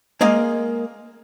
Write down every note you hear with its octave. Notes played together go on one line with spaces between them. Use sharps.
G#3 A#3 D#5 F5